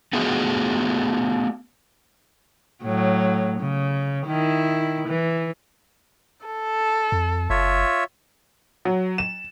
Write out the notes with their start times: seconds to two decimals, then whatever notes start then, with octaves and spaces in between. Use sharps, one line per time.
0.13 A3 B3 F4 F#4 G#4
2.84 A2 F#3
3.59 C#3
4.27 D#3 E4
5.08 E3
6.46 A4
7.12 F2
7.50 F#1 F4 C#5 E5
8.85 F#3
9.18 E7